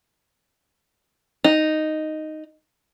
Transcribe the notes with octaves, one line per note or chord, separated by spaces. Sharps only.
D#4